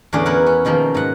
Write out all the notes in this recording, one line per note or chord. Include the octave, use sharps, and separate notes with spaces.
E2 A2 D3 C#4 G#4 D5
B3 E4 A#4 F#5
C#4
B2 D#3 F3 A#3
G#2 F#5